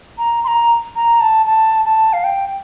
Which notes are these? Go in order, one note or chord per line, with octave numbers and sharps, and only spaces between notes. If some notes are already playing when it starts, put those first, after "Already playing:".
A#5
C6
A#5
A#5
A5
A5
A5
F5
G5